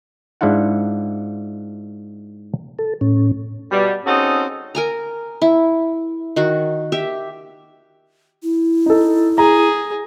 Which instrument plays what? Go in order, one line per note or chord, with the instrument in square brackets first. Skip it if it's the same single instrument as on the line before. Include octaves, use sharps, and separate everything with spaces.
[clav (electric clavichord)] G#2 D4 E4 F4 F#5
[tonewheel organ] A4
A2 C#4
[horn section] B2 G3
C4 C#4 D#4 F#4 G#4 A4
[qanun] A#4 G#5 A#5
E4
D#3 F#4
G4 E5
[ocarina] E4
[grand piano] D#4 A4
[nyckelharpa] G#4 [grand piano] A#5